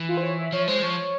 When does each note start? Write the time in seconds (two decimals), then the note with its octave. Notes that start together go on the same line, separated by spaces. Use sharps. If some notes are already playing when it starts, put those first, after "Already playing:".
Already playing: E3
0.09 F4
0.17 C5
0.23 C#5
0.38 E5
0.52 F3 C#5
0.68 G#3 C5
0.82 F3 C#5